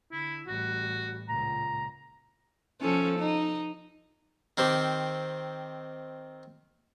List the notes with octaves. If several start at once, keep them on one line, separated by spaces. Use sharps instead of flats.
D3 E4
A1 G3 F#4
C#2 A#2 A#5
F3 C#4 A4
D#4
D#3 C4 G4